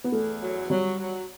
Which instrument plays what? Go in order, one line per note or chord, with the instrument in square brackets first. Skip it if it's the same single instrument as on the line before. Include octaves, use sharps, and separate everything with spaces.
[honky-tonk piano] B3
[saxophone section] E2 [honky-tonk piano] A3
[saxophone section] F#3
[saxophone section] F#3 [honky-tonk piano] G3
[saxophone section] F#3